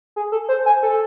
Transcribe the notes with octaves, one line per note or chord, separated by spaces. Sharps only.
G#4
A4
C5
G#5
A4